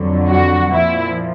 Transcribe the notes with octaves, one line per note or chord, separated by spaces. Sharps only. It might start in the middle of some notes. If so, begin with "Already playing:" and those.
Already playing: F2 D3 F#3
F#4
A#2 F3 E4